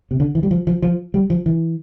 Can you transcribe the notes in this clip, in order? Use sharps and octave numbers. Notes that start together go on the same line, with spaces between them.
C3
D3
E3
G3
F3
F3
F3
G3
F3
E3